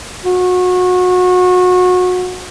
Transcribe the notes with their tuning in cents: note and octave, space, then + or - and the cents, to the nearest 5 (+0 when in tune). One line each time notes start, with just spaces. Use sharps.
F#4 -30